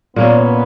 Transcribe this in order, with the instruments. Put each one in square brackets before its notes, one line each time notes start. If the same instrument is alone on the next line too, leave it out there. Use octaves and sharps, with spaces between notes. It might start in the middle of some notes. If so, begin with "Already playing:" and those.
[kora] A#2 A#3 C#4 [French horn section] B3